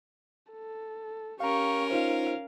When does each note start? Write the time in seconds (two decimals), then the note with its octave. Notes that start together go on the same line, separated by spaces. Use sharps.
0.52 A4
1.40 C#4 G4 A#4 F5 A#5 C#6
1.91 D#4 F4 C5 F5